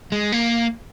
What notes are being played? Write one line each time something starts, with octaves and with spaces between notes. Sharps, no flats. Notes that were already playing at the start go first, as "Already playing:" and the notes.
G#3
A#3